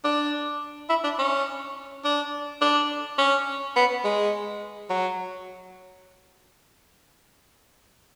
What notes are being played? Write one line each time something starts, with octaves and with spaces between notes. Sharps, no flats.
D4
E4
D4
C#4
D4
D4
C#4
B3
G#3
F#3